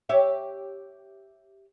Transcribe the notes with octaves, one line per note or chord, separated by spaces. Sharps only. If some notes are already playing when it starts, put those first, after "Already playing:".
G4 C#5 E5